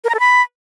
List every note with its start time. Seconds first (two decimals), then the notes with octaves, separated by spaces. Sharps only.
0.04 A#4
0.09 A#5
0.14 A4
0.20 B5